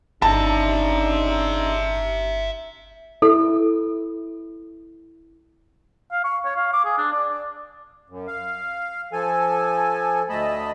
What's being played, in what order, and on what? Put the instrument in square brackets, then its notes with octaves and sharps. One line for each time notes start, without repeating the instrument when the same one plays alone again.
[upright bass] G1 [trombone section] C#3 D4 D#4 [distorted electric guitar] E5 A#5 [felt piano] A5
[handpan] E4 [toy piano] A4
[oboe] F5
C#6
C#5
F5
D6
G#4
D4
D5
D5
[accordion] F#2
F5
F3 A4 G#5
D2 A3 D#5 A5 B5